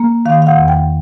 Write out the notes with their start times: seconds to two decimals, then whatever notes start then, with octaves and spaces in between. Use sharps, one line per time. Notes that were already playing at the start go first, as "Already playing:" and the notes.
Already playing: A#3
0.26 D#3 F5
0.42 F5
0.47 F#5
0.58 E2
0.68 G5